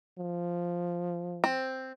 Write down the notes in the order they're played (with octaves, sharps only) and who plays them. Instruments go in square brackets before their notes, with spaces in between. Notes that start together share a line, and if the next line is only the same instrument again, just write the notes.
[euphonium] F3
[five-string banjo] C4